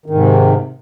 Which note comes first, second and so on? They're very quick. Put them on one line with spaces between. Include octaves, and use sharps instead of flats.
D#3 G#2 C3